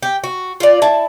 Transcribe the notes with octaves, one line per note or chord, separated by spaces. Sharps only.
G4
F#4
F4 D5
E4 A5